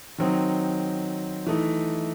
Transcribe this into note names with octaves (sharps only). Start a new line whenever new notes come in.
D#3 F#3 C4 D#4
E3 A3 D#4